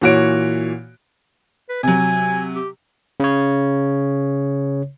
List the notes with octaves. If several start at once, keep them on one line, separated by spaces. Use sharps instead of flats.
A#2 E3 F#4 C#5 D7
B4
C3 F#3 G#5
G4
C#3 C#5